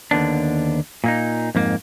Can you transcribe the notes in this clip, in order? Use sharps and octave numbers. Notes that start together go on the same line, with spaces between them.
D#2 D3 B3 D4
A#2 A#3 D#4
F2 G#2 A#3